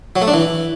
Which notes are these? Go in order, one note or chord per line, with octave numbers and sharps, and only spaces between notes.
F#3
A3
D4
E3